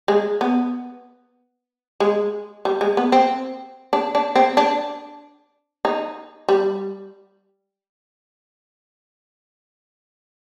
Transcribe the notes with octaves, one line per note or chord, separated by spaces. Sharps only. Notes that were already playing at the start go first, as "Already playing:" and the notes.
G#3
B3
G#3
G3
G#3
B3
C4
D4
D4
C4
D4
D#4
G3